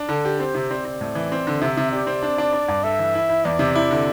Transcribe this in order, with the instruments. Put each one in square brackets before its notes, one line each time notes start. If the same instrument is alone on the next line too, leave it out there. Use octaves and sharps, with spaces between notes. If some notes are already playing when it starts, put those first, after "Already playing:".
Already playing: [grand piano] D4
[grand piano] D3 [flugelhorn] A4
[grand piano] G4
[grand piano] C4 [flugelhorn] C5
[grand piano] C3
[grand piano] C4 [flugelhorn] D5
[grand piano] C4
A2
E3
C4
D3
[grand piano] C3 [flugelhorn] E5
[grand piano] C3
[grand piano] G4 [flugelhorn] D5
[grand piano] C4
D4
D4
D4
G2
[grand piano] A4 [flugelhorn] E5
[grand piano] E3
E4
E4
[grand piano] E2 [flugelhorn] D5
[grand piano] C3
E4
D3